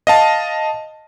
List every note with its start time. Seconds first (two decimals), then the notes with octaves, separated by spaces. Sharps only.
0.07 D#5 F5 A5